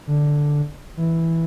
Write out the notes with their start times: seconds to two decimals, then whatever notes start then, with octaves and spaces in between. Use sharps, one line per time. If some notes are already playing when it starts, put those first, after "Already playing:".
0.07 D3
0.97 E3